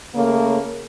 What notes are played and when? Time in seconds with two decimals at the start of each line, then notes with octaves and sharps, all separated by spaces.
0.15 C#3 A3 A#3